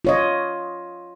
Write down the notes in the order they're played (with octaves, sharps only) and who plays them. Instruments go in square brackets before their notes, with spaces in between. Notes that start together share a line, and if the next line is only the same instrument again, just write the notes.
[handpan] F4 C#5 D#5